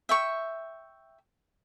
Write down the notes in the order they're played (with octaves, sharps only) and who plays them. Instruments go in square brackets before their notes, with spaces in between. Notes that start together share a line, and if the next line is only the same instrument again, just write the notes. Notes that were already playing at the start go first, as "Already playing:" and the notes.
[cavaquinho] E5 G5 C#6